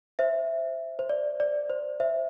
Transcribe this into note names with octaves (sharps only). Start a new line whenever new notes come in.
C5 E5
C5
D5
D5
C5
C5 E5